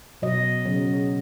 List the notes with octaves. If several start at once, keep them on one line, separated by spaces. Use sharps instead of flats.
B2 F#3 D#5
C#3 F#3